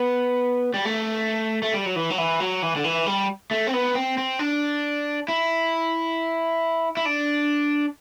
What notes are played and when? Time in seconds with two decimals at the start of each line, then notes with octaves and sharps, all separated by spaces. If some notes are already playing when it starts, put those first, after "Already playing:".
Already playing: B3
0.74 G3
0.85 A3
1.62 A3
1.74 G3
1.86 F#3
1.96 E3
2.10 F#3
2.18 E3
2.40 F#3
2.62 E3
2.75 D3
2.84 E3
3.06 G3
3.51 A3
3.67 C4
3.73 B3
3.95 C4
4.18 C4
4.39 D4
5.28 E4
6.97 E4
7.05 D4